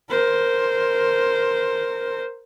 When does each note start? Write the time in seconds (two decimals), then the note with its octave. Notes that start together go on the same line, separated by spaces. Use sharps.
0.10 A#4 C5